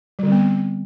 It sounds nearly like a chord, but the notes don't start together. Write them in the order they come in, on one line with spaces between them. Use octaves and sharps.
G3 D3 C4 B3